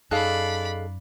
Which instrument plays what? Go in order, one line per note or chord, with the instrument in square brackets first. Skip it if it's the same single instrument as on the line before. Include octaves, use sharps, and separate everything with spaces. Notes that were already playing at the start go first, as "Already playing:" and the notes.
[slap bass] F#2 [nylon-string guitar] D#4 G#4 A4 [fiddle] D5 B5 [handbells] F5 F#6